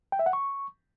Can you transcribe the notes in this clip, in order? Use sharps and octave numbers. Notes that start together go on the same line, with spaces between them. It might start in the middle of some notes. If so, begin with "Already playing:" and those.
G5
E5
F#5
C#6